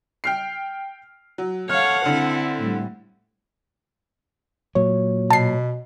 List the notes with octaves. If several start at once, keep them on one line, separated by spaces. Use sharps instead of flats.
G5 F6 C7
F#3
A4 C#5 F5 F#5 F6
D3 C4 E4
A2 G3
A#2 F#3 C#5
B2 A5 C7